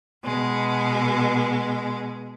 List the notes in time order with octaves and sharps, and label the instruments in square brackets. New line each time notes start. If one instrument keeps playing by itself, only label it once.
[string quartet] B2 G#3